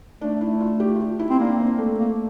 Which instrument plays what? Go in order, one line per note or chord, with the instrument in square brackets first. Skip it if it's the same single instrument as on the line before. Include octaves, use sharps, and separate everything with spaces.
[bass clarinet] A3 [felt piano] D4
[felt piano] E4
F4
G4
F4
G4
E4
[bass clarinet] C4
[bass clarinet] A#3 [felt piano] D4
[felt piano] C4
A3
[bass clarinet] A#3